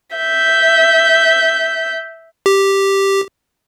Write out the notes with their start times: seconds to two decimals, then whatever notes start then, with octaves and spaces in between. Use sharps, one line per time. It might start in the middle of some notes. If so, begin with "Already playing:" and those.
0.16 E5 G6
2.46 G4